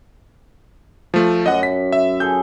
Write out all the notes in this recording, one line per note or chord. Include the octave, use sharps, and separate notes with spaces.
F3 A3
F#2 D#5 F#5
B6
E5
G#4 A4 G6